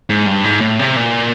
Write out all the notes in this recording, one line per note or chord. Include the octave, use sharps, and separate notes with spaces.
G#2
G2
G#2
A2
C3
A#2